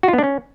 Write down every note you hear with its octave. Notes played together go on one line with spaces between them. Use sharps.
F#4
F4
B3
D4
C#4